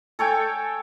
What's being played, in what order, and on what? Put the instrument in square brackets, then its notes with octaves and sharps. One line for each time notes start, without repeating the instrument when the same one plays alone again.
[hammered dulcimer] A4 C#5 G5 G#5